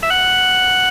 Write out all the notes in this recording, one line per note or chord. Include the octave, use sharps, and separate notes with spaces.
E5
F#5